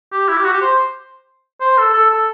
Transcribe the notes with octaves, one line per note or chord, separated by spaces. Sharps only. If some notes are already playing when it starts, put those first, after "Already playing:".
G4
E4
G4
F#4
G4
C5
C5
A4
A4
A4